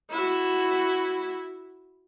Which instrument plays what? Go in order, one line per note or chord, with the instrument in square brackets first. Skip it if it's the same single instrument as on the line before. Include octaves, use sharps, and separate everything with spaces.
[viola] E4 F#4